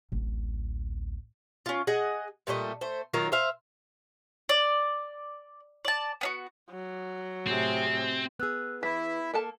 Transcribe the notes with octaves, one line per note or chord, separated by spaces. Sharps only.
D1 A1
C#4 F4
G#4 D#5 F#5
A#2 G3 A3 D#5
A3 C5
D#3 F#3 F4 A#4
C5 E5 F5
D5
D5 A5
B3 D4 F#4
F#3
A2 C3 C4 G#4
B3 G#4 E6 F#6
E3 E4 B6
A#3 A4 A5